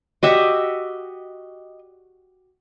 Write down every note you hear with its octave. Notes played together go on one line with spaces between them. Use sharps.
F#4 G4 D#5 E5